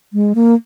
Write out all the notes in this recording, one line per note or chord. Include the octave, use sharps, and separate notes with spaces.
G#3
A#3